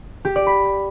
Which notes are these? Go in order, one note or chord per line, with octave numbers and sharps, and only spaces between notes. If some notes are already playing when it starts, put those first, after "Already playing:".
G4
D5
B5